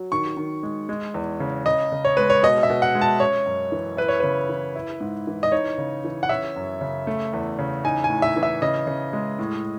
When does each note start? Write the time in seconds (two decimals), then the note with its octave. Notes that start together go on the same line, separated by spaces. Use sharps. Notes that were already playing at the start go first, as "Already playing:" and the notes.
Already playing: F#3
0.12 D#3 C#6
0.37 D#3
0.63 G#3
0.89 G#3
1.14 E2
1.40 C#3
1.66 C#3 D#5
1.92 C#3
2.05 C#5
2.17 G#3 B4
2.30 C#5
2.43 B2 D#5
2.63 E5
2.70 B2
2.82 F#5
2.95 G#3
3.01 A5
3.20 C#4 C#5
3.46 F#2
3.72 E3
3.97 E4 B4
4.08 C#5
4.20 C#3 B4
4.49 E3
4.76 E4
5.00 G#2
5.27 E3
5.43 D#5
5.52 D#4 C#5
5.78 C#3
6.05 E3
6.23 F#5
6.29 C#4 E5
6.56 F#2
6.81 C#3
7.07 A3
7.33 E2
7.58 C#3
7.84 D#4 G#5
8.04 G#5
8.10 A2
8.22 E5
8.36 E3
8.43 E5
8.62 C#3 D#5
8.87 C#3
9.13 G#3
9.39 A2